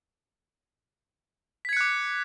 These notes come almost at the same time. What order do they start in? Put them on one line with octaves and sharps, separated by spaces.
B6 G#6 C#7 F#6 D6